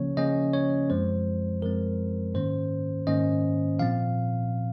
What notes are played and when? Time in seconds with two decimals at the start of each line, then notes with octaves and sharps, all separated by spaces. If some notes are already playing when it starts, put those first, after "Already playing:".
Already playing: C#3 F3 A#3 C#4 C#5
0.17 C#3 F3 A#3 C#4 D#5
0.53 C#5
0.89 F#2 F3 G#3 C4 C5
1.62 F#2 F3 G#3 C4 A#4
2.34 G#2 D#3 A#3 C#4 C5
3.07 G#2 D#3 A#3 C#4 D#5
3.79 A#2 F3 C4 F5